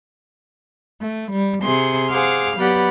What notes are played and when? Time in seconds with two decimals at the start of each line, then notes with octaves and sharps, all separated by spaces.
1.01 A3
1.32 G3
1.64 C3 G#4 C6
2.11 G#4 C5 F5 F#5 D6 F6
2.57 F#3 B3 G4 B4 D5 F#5